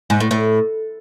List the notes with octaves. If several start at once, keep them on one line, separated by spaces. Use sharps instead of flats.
G#2
A2
A2